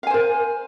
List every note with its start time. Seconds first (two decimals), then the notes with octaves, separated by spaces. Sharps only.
0.03 F5
0.07 G#5
0.10 C5
0.14 A#4